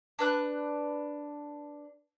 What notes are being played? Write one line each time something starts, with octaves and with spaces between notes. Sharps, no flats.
D4 B4 F#6